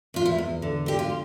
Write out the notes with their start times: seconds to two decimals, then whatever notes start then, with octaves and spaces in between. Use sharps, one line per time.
0.14 E2 F4
0.26 E4
0.38 E2
0.62 D3
0.86 D3 G4
0.99 F4